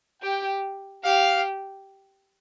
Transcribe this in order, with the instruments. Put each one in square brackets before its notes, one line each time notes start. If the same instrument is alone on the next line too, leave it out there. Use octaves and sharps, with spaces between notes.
[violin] G4 [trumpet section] G5
[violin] G4 [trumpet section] F5